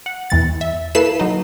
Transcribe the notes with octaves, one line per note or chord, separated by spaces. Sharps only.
F#5
E2 E3 A6
E5
A#3 E4 A4 B4 C7 E7
F#3 D#4